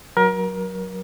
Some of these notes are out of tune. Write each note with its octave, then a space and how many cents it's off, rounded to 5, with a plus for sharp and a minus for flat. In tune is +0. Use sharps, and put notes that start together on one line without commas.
F#3 +0 A#4 +30